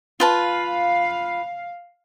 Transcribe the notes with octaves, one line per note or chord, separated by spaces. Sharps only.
F4 B4 F5 A5